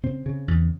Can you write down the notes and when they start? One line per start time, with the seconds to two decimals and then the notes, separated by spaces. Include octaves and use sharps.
0.03 C#3 C4
0.26 C#3
0.48 E2